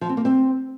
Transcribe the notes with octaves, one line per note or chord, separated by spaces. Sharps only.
F3
C4
A#3
C4